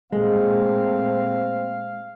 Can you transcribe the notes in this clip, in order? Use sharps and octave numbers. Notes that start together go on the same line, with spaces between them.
A#2 G#3 A3 C4 F5